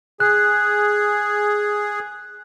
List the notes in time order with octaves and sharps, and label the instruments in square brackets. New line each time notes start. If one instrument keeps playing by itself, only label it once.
[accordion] G#4 [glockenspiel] F#6